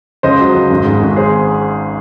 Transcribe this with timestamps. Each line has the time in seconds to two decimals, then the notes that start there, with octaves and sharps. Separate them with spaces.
0.23 C#2 C5 D#5
0.40 F#3
0.54 C#2
0.70 G#1
0.85 G#2
1.02 G#1
1.16 G#4 C5